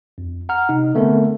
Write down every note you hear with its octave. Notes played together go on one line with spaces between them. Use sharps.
F2
F#5 A#5 F6
C3 D#4
D3 A3 B3 C4 A#4